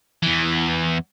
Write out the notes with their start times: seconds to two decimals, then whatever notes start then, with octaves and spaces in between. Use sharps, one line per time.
0.23 E2 E3